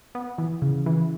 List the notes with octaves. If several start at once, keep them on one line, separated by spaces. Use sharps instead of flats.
B3
E3
C#3
E3